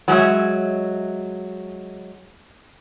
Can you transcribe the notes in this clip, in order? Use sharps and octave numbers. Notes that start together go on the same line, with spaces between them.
F#3 G#3 C#5 E5